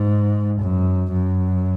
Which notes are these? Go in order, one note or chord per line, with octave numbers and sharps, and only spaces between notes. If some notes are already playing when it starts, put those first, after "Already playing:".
Already playing: G#2
F#2
F#2